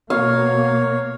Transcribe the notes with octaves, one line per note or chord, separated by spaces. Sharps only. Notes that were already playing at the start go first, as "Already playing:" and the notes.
B2 A#3 C#5 F5